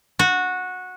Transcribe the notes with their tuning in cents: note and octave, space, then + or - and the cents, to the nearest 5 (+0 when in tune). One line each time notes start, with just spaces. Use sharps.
F#4 -15